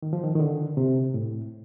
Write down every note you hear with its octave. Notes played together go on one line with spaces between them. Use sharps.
D#3
F3
D#3
D#3
D3
C3
A2